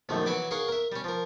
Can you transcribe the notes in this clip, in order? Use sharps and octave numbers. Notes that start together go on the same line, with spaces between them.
A#1 F#2 D#3 A3
E3 F#3 F#4 C#5 B5 D6
G#4 A#4 C#5 F5 F#5
A#4 E5
G3 C#4
F3 A#4